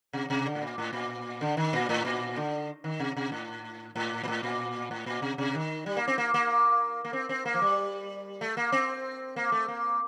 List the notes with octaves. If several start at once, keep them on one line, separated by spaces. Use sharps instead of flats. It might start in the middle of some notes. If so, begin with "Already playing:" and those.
C3
C3
D3
A2
A#2
A2
A#2
D3
D#3
A#2
A2
A#2
D3
D#3
C3
C3
A2
A2
A#2
A2
A#2
A2
A#2
C3
C3
D#3
G3
A#3
C4
A#3
A#3
A#3
C4
C4
A#3
F3
G3
A3
A#3
C4
A#3
A3
A#3